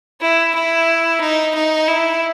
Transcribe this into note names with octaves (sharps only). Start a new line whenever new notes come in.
E4
E4
D#4
D#4
E4